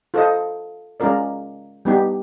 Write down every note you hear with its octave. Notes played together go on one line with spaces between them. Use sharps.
F4 A4 C5 D#5
G#3 C#4 F4 A#4 D5
G3 B3 D#4 G4